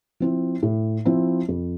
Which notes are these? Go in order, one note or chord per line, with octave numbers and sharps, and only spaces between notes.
F3 C4 E4
A2
F3 C4 E4
F2